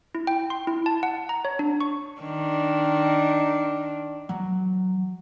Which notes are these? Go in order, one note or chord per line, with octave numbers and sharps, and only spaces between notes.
E4
G5
C6
E4
A5
F#5
A#5
C#5
D4
C#6
D#3 D4
E3 F#3